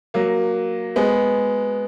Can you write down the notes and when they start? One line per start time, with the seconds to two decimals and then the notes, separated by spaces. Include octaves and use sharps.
0.14 F#3 A#3
0.96 G#3 B3